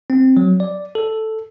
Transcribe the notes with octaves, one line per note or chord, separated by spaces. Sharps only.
C4
F#3
D5
A4